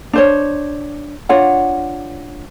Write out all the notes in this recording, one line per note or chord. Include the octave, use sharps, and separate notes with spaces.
D4 C5 C#5
D4 F4 C#5 F#5